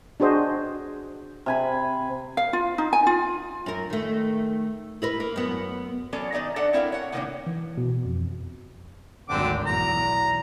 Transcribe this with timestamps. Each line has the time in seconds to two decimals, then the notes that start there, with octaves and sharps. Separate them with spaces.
0.20 D4 F#4 G#4 C5 D#5
1.46 C3 G#5 B5
2.37 F5
2.53 F4
2.78 D#4
2.93 G#5
3.07 F4
3.66 F#2 A#4
3.90 D#3 A3
5.02 E4 A#4 B4
5.20 A#3
5.36 F#2 B3
6.12 E3 F#3 B3 C#4 A4 D5
6.32 D#3 D#4 D5 E5 A#5
6.56 D4 A4 D5 E5 F#5
6.73 C4 E4 A#4 E5 F5
6.92 C#5 F#5
7.12 A2 C3 D#3 A#3 D4 D#4
7.47 E3
7.77 B2
8.05 F2
9.29 G#1 D2 D3 C4 D6
9.66 B1 E2 A#5